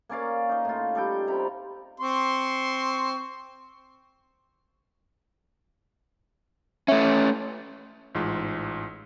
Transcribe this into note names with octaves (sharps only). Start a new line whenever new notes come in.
A#3 C#4 D5 F5
D#4 D#5
A2 F4
G3 A4 G5
C3 A#5 B5
C4 C6 C#6
A3 C#4 E5
A1 G#2 F4